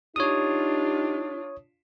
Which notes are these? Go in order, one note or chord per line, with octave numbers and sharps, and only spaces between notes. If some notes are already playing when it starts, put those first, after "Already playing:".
D4 D#4 F4 G4 C#5 D#6